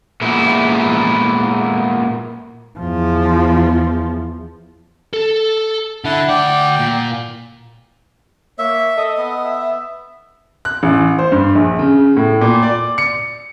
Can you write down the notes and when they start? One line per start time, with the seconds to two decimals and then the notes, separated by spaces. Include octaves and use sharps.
0.22 A#2 G#3 B3 E4
2.79 E2 F3
5.13 A4
6.05 D3 E4 F#5 A5
6.29 D2 D5 F#5 G5
6.80 A#2
8.59 A#3 C#5 E5
8.97 A4 D#5
9.18 B3
9.45 E5
10.65 F#6
10.83 A1
11.18 C5
11.32 G2
11.55 A#1
11.79 C#3
12.17 A2
12.41 A#2
12.63 D5
12.98 C#7